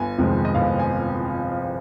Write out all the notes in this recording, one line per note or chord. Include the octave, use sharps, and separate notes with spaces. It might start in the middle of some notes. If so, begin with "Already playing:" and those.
Already playing: G1 G#5
F2 C3 D#3 G#3
D#5
G1 F5
G#5